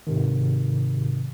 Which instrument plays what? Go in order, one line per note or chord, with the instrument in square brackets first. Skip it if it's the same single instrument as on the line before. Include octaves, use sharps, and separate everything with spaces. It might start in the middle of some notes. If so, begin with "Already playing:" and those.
[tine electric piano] G#2 C3 D#3